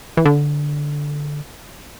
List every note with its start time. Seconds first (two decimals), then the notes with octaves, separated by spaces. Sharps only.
0.17 E3
0.26 D3